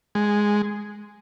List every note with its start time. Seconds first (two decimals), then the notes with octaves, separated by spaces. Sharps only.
0.15 G#3